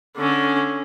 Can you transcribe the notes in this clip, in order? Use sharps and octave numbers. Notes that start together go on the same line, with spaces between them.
D3 C#4